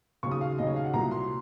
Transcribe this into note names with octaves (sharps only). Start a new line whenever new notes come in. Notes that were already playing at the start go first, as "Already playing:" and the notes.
D#2 C#3 F#3 C#6
D#6
F5
D#2 C#3 F#3 D#5
C#5
F5
F#5
C2 A#2 F#3 A#5
C6